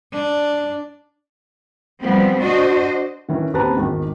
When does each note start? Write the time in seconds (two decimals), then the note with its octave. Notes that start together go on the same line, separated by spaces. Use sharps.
0.12 D4
2.02 F3 G3 B3 C4
2.40 D4 F#4 C5 D#5
3.29 D#3 E3 C#4
3.54 D#2 C4 C#4 B4 A5 A#5
3.77 G#1 E2 D#3